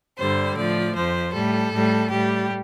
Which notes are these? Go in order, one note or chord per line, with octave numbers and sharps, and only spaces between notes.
G2 D3 G3 C5
A2 F3 D5
F2 F3 C5
A2 G3 A4
A2 G3
A2 G3 G4